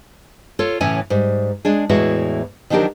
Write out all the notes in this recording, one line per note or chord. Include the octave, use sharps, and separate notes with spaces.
F4 A4 C#5
A2 C#3 E3 C#4 C#5 G#5
G#2 G3
G#3 D4 G#4
E2 A2 E3 G#3 E4 F#4
D#3 F3 F#3 D4 G4 A#4